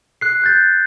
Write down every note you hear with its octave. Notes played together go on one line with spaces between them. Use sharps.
F#6 C7
F#6 G6 A6